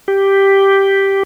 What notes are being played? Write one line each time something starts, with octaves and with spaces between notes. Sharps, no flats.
G4